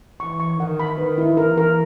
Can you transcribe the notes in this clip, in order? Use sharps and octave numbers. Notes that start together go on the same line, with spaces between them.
E3 C#6
C#6
D#3 F#5
B5
D#3 B4
E4
E3 A#4
A#4